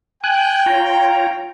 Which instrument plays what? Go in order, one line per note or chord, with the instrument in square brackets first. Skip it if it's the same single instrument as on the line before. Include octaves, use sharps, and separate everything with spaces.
[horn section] G5 [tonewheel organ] G#5 F#6
[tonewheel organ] F4 C#5 A#5